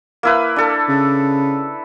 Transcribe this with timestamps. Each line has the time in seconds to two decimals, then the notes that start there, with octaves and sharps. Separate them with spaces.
0.23 A#3 E4 B4
0.56 D4 A4
0.89 C#3